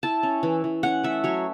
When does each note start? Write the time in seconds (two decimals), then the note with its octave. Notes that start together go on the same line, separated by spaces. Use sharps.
0.03 E4 A5
0.23 C#4
0.43 E3
0.64 E3
0.83 C#4 F#5
1.03 A3 E5
1.24 F#3 C#5